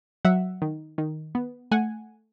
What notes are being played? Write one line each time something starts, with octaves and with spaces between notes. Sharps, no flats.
F#3 E5 F#5
D#3
D#3
B3
A3 F#5 G#5